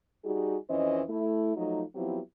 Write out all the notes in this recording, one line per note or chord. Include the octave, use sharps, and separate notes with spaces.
G3 D#4 F#4 G#4
F2 E3 C#4 C5 D#5
A3 E4
F3 F#3 A3 D#4
F3 F#3 B3 C4 E4 G4